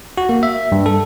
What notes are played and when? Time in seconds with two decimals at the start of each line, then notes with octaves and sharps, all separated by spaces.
0.17 F#4
0.29 A#3
0.43 E5
0.72 G2
0.86 A4